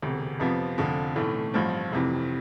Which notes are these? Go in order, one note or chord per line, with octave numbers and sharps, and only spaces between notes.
E1 D2 C3
F2 C3 F3 B3
F1 F2 D3 F3
B1 A2 E3 A3
A1 G2 F3 C4
F1 F2 C3 E3